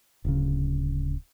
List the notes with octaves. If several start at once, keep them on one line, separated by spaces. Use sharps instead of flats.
D1 C#3